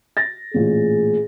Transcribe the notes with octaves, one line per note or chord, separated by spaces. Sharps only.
A6 A#6
A1 A#2 G#4